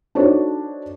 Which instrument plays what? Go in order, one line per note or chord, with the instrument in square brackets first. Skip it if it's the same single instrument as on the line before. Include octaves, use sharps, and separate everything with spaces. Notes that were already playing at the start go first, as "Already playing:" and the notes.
[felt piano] D4 D#4 F#4 A4 C5 C#5